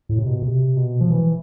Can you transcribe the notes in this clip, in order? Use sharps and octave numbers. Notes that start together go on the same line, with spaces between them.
A2
C3
B2
C3
B2
F3
E3